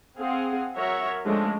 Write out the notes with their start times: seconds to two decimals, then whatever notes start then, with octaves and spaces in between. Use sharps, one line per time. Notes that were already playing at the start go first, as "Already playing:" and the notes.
0.18 C4 G#4 F5 F#5
0.76 F#3 F#4 A#4 C#5 E5
1.25 F3 G#3 A3 C#4 D4